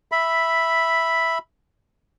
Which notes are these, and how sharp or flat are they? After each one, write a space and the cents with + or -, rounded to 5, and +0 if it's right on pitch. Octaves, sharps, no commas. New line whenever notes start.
E5 +0 B5 +0